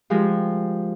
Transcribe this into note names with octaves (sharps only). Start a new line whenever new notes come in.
F3 G#3 G4 G#4 A#4